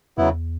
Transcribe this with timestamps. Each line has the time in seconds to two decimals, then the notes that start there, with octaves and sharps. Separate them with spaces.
0.18 E2 C#3 F#3 B3 E4